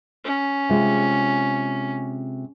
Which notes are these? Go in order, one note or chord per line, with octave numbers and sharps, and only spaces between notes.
C#4
C3 G#3 F4